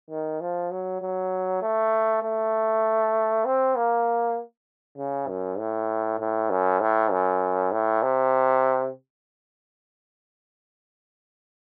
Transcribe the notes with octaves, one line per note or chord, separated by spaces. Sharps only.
D#3
F3
F#3
F#3
A3
A3
C4
A#3
C#3
F#2
A2
A2
F#2
A2
F#2
A2
C3